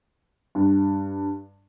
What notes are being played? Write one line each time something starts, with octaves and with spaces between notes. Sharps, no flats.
G2